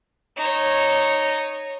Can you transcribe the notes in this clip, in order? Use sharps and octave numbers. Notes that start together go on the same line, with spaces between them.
D#4 C#5